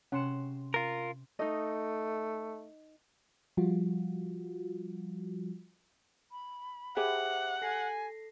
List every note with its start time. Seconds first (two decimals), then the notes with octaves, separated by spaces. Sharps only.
0.12 C3 C#4 F#5 C6 E7
0.74 F4 A#4
1.39 A3 D#4 D#5
3.57 F3 G3 F4 F#4
6.31 B5
6.97 G4 G#4 C5 E5 F#5 D6
7.62 A4 G#5 A#6 C7